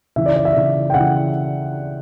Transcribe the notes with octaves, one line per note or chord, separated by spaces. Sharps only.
C#3 E3 E5
D5
D5
E5
C#3 E3
G5
C#3 F#5
E3